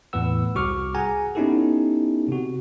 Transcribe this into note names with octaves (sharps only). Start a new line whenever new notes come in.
E2 A2 B4 F#5 E6
C2 F#4 C#6 D6 F6
G#4 F#5 G#5 A#5
B3 C#4 D#4 E4 G4 A4
C3 F#4